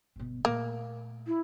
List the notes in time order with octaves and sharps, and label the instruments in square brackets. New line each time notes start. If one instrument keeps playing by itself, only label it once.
[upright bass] G1 B2
[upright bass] A#2 A3 [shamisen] A#3
[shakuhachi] E4